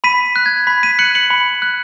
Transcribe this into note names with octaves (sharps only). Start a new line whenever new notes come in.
B5 B6 D#7
F#6
G#6
B5 B6
B6 D#7
F#6 C#7 F#7
C#7 F#7
B5
F#6